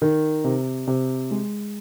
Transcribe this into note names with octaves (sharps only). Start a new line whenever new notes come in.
D#3
C3
C3
G#3